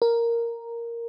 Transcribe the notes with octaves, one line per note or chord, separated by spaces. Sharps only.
A#4